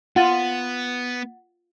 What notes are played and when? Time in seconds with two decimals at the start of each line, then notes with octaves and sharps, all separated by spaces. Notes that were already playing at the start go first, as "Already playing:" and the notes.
0.16 B3 F4 F#5 A6 D#7